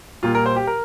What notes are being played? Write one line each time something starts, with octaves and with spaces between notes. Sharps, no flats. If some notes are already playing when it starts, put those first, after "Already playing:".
A#2 G3 A#3 F4
A#4
C5
G4
A#4